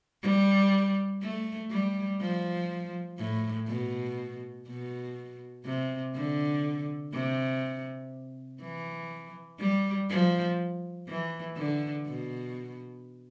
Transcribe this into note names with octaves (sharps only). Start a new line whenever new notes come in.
G3
A3
G3
F3
A2
B2
B2
C3
D3
C3
E3
G3
F3
E3
D3
B2